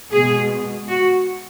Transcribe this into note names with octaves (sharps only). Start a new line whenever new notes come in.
B2 G#3 G#4
F#4